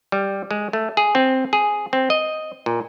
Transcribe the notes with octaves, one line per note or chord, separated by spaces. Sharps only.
G3
G#3
A3
G#4
C4
G#4
C4
D#5
A#2